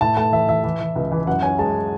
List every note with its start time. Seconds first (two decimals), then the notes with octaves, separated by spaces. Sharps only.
0.01 A2 A5
0.17 A3 A5
0.32 E3 E5
0.48 E3 E5
0.64 E3
0.81 E3
0.96 C#2
1.12 E3
1.27 F#2 F#5
1.42 C#4 G#5
1.58 G#3 A5